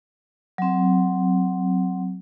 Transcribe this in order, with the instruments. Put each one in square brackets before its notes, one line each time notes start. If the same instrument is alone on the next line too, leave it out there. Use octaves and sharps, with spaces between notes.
[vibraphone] F#3 C4